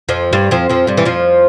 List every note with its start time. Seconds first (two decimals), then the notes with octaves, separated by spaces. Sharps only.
0.09 F2 F3
0.33 G2 G3
0.51 F2 F3
0.69 F2 F3
0.87 G2 G3
0.97 E3
1.05 F2 F3